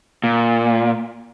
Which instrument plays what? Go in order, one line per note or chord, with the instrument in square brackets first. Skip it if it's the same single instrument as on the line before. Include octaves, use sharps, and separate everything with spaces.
[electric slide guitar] A#2